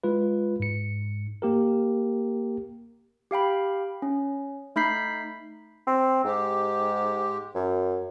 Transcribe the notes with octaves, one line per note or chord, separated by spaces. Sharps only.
G#3 F4 B4
G#2 C#7
A#3 G4 A#4
G4 F5 G5 B5
C#4
A3 D#4 B5 G6 B6 C7
C4
G#2 G#3 G4
F#2